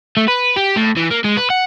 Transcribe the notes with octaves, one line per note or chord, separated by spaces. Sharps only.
A3
B4
G4
A2
E3
A#3
G#3
B4
F#5